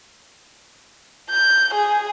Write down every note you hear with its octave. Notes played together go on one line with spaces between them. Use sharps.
G6
G#4